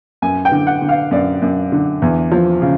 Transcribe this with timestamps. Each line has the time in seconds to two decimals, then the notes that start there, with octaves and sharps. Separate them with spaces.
0.22 F#2 G#5
0.45 G5
0.51 D3
0.67 F#5
0.81 D3
0.89 F5
1.11 F#2 D5
1.42 F#2
1.72 D3
2.02 E2
2.32 F3
2.62 C#3